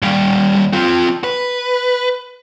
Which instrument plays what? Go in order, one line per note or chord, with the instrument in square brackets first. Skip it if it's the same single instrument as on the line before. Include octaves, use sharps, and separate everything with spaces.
[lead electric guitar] D#2 G3
C4 F4
B4